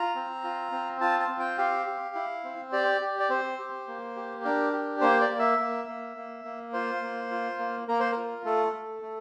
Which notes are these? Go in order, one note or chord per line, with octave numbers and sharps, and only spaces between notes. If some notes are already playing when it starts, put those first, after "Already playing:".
Already playing: F4 A#5
C4
F4
C4
F4 A5
A5
C4
G5
G4 F5
G4
E4
C4
G4 D5
G4
D5
C4 C5
G4
A#3
G4
D4 A#4
G4
A#3 C5
D5
A#3
E5
A#3
A#3
A#3
A#3
F4 C5
A#3
F4
A#3
A#3 A#4
C5
F4 A#4
A3 A4
A3
A3